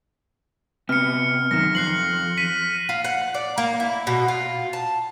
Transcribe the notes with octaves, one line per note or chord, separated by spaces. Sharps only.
C3 B3 F6 C#7
F#2 D#3 F6 A#6
F2 F#6 C7 F#7
B6 D#7
F4
F#5
D5
A#3
E4
B2
F4
A5